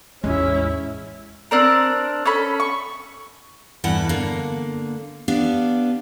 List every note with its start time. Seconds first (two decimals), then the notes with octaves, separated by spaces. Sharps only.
0.24 A1 E2 G#3 C#4 E4
1.51 C4 D4 A#4
2.25 C#4 A4 B5
2.60 C#6
3.84 E2 G2 E3 A4 F#5
4.09 D3 A#3
5.28 B3 D4 G4 F5